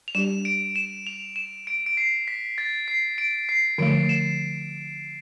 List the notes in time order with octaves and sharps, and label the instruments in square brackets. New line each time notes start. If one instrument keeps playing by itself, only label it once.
[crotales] F7
[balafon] G3 D4 G4 D5 [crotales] E7
[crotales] D7
E7
F7
E7
D7
D7
C7
B6
A6
C7
D7
C7
[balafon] D3 F3 A3 [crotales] D7
[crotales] E7